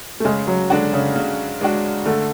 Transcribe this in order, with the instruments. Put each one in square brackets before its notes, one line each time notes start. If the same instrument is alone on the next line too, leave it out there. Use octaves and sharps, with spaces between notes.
[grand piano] A3
[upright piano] C#3 [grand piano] G#3
[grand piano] F#3
[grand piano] D3 [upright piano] G#3 D4 F#4
[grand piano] C#3
[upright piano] C#3
G#3 D4 F#4
[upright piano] D3 [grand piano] A3